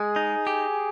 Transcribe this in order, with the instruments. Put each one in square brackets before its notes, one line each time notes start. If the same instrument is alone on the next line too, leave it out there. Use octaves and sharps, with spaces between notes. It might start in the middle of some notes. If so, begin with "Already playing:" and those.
Already playing: [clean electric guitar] G#3 [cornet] G#4
[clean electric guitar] D#4
G4